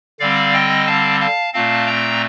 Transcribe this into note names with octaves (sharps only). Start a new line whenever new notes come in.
D3 G3 C4 D5 F5
D#5 G5
F5 A5
F5 A5
A#2 A3 C4 F5 A5
G5 A#5